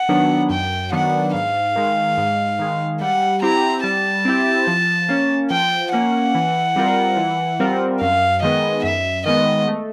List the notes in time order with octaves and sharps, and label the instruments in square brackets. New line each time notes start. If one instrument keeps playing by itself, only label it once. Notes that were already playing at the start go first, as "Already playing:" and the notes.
Already playing: [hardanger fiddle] F#5
[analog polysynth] D#3 F#3 B3 D4
[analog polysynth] F#2 [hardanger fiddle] G5
[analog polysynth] D#3 F#3 B3 D4 [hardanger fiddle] F#5
[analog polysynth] G#2 [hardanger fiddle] F5
[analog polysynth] D#3 G#3
G#2
D#3 G#3
[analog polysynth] G3 [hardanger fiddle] F#5
[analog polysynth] C4 E4 G4 [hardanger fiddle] A#5
[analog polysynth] G3 [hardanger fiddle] A5
[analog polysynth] C4 E4 G4
F3
A#3 C#4
[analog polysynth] F3 [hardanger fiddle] G5
[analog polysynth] A#3 C#4 [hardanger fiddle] F#5
[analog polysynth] E3
G3 C4 F4 A#4
E3
G3 C4 F4 A#4
[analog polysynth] F#2 [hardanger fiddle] F5
[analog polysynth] D#3 G#3 B3 [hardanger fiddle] D#5
[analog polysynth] F#2 [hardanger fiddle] E5
[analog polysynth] D#3 G#3 B3 [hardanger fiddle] D#5
[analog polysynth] A3